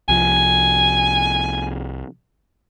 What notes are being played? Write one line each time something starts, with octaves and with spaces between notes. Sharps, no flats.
C2 F3 G#5